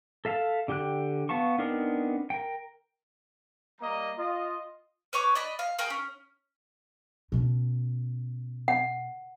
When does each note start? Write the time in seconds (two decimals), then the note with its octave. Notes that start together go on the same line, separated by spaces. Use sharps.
0.25 A4 E5 F5 A5
0.68 D3 G4 G5 F#6
1.29 B3 F5 A5 C#6
1.58 B3 C4 D4 D#4 A#4
2.30 A#4 G5
3.80 G3 A#3 D#5 A#5
4.18 F4 D#5
5.13 B4 C#5 C#6 D6
5.35 D5 D#5 B5
5.59 F5
5.79 G#4 A#4 F5 G5
5.90 C#4
7.32 B2 C#4
8.68 F#5